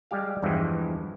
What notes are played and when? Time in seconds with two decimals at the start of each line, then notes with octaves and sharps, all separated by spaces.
0.11 G3 G#3 G4 F5
0.42 E2 G2 E3 F3 G#3